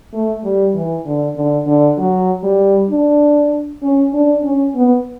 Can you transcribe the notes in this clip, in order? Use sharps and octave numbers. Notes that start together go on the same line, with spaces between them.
A3
G3
E3
D3
D3
D3
F#3
G3
D4
C#4
D4
C#4
B3